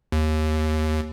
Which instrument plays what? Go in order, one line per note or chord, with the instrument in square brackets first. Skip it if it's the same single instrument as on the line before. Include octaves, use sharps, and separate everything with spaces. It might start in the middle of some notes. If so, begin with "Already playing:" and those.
[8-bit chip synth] D#2